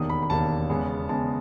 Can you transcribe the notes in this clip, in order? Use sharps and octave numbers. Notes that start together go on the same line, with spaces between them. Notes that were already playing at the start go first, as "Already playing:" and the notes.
Already playing: E1 D#2 D#3 D#6
B5
B5
E1 D#2 D#3 A5
E2 C#3 G#3 B3
E2 C#3 G#3 B3 A5